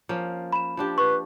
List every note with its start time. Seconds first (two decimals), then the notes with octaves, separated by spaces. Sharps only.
0.09 F3 A#3 C#4
0.53 B5 E7
0.77 F3 D4 G4
0.98 B4 C#6